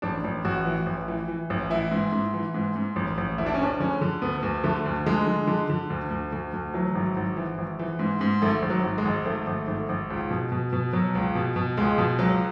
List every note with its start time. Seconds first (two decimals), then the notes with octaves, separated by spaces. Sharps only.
0.02 A1 D4
0.24 A1
0.45 A1 F#4
0.65 E3
0.86 A1
1.08 E3
1.28 E3
1.50 A1
1.70 E3 E4
1.91 G#2
2.12 G#2
2.34 E3
2.54 G#2
2.76 G#2
2.96 A1
3.18 A1
3.38 D2 E4
3.46 D4
3.54 C#4
3.59 D2 D4
3.80 D3 C#4
4.01 D3
4.22 D2 B3
4.43 D2
4.64 D3 A3
4.86 D2
5.06 D3 G#3
5.28 D3
5.47 D3
5.70 D3
5.90 D2
6.11 D2
6.32 D2
6.54 D2
6.74 E3 F#3
6.95 G#1
7.16 G#1
7.36 E3
7.58 G#1
7.79 E3
7.99 G#2
8.21 G#2
8.42 G#1 A3
8.62 G#1
8.70 F#3
8.83 G#1
8.98 G#3
9.05 G#1
9.25 G#1 A3
9.47 G#1
9.67 G#1
9.89 G#1
10.10 C#2
10.31 B2
10.52 B2
10.73 B2
10.93 B2 F#3
11.15 C#2
11.35 B2
11.56 B2
11.77 C#2 G#3
11.98 B2
12.19 C#2 F#3